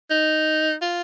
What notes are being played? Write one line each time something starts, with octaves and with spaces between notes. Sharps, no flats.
D#4
F4